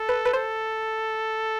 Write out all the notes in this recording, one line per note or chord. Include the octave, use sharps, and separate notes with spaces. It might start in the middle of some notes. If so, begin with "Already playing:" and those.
Already playing: A4
B4
B4
A4 C5